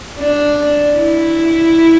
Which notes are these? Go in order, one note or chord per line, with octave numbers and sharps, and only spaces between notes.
D4
E4